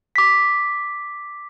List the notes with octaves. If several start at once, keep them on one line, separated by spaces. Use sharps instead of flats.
D6 B6